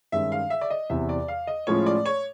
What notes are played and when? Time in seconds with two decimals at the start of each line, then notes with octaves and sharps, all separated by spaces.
0.12 G2 D#3 G#3 C#4 E5
0.32 F5
0.50 E5
0.61 D5
0.70 D#5
0.90 E2 C3 E3 E5
1.09 D5
1.28 F5
1.47 D#5
1.67 A2 F3 G#3 C#4 F4 C#5
1.86 D5
2.06 C#5